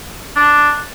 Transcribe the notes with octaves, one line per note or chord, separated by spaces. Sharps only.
D4